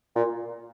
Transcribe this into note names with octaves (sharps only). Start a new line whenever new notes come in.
A#2